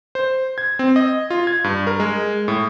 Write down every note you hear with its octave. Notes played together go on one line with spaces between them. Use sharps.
C5
G#6
C4
D#5
F4
G#6
G2
A#4
G#3
A2